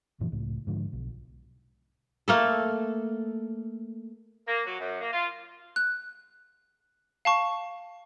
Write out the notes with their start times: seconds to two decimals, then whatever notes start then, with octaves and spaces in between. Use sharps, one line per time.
0.20 F#2 A#2 E3 F3
0.32 C#2 A2
0.67 G#2 D3 F3
0.93 B1
2.28 A3 A#3 A4
4.48 A#3
4.67 F#3
4.81 F#2
5.01 A#3
5.13 F4
5.76 F#6
7.25 F5 A5 C#6